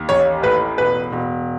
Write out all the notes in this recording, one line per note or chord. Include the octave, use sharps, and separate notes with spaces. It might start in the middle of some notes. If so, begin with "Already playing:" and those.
Already playing: D#2
A1 C#5
A2 B4
E1 B4
E1